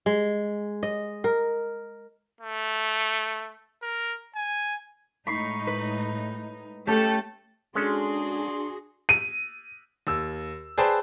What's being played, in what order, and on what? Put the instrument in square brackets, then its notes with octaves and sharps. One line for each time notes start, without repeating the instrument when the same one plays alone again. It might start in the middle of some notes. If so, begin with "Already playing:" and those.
[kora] G#3
D#5
A#4
[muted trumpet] A3
A#4
G#5
[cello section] A2 G#3 D#4 [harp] B5 C#6 C7
[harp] B4
[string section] A3 A4 [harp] C#4 G4 A5
[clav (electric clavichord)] G#3 C#4 A4 [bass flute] D4 [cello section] F#4 G#4 [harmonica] D5 C6
[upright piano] D#7
[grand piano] D#2 E6
G#4 B4 C5 D5 G5 A5